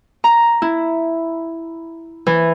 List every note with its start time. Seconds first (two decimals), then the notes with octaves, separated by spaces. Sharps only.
0.24 A#5
0.62 E4
2.27 E3